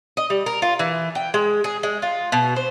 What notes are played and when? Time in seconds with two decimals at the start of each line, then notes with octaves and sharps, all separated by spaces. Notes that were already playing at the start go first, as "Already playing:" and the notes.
0.17 D#5
0.30 G3
0.46 A#4
0.62 F4
0.79 E3
1.15 G5
1.34 G#3
1.64 G#4
1.83 G#3
2.02 F4
2.32 B2
2.56 C5